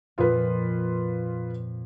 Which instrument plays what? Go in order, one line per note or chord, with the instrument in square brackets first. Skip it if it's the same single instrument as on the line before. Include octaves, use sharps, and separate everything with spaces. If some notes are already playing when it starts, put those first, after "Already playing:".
[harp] F2 A#2 F3 [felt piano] F4 B4